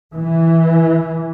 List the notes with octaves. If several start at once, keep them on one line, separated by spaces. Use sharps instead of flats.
E3